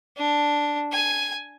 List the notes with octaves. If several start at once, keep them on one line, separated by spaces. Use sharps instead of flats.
D4
G#5